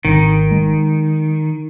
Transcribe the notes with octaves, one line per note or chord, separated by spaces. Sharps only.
G#1 D#3
G#3